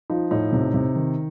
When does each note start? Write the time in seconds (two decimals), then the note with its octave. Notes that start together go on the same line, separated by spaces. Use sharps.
0.10 F3 D#4
0.31 A2 D#4
0.53 C3
0.74 C3
0.96 D#3